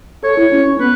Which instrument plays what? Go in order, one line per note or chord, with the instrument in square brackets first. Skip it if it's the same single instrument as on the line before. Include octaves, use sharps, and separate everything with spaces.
[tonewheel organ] A4 [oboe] C#5
[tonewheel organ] E4
C#4
[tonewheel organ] B3 [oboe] B4